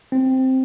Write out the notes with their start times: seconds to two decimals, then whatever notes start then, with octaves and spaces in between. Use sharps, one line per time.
0.12 C4